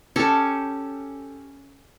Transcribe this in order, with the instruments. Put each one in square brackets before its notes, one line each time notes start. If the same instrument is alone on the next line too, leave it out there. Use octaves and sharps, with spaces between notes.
[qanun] C#4 G4 A4 [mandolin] A5